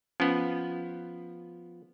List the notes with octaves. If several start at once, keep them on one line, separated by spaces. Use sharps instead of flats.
F3 B3 C#4